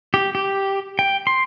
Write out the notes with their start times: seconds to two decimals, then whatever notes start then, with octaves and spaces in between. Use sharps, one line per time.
0.14 G4
0.35 G4
0.99 G5
1.27 C6